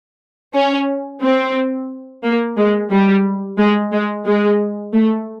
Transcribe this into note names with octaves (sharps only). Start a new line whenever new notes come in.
C#4
C4
A#3
G#3
G3
G#3
G#3
G#3
A3